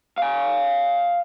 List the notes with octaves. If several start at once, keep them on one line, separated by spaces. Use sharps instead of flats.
F5 G#5